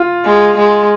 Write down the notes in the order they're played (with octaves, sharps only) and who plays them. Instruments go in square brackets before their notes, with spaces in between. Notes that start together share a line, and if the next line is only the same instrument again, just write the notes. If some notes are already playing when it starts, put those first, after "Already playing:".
Already playing: [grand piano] F4
[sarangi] G#3
G#3